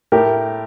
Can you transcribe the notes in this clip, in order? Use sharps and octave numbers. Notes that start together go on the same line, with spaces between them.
A2 G4 A#4